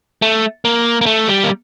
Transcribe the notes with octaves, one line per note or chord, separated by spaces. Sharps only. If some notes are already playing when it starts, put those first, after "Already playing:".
A3
A#3
A#3
A3
G3
A#3